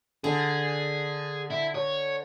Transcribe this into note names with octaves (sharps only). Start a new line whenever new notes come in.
D3 G#4
E4
C#5